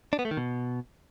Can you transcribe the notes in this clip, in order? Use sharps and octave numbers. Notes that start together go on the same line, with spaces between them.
D4
B3
A3
D#3
B2